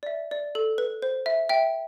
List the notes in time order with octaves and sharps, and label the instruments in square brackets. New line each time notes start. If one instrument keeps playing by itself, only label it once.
[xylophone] D5
E5
D5
A4
B4
C5
E5
E5 G5